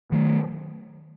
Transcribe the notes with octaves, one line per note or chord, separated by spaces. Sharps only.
D#3 F#3 A3